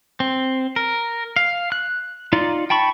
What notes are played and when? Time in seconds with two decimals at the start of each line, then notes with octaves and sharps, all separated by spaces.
0.20 C4
0.76 A#4
1.36 F5
1.72 F#6
2.33 D#4 F4 D5
2.70 G5 A5 B5 C#6